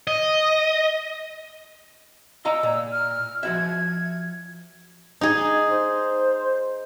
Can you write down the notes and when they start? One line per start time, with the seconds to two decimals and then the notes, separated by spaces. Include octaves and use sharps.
0.07 D#5
2.45 D#5 F5 A#5 E6
2.63 A#2
2.92 F6
3.43 F3 F#4 E5 G#6
5.21 D#4 G#4
5.68 C5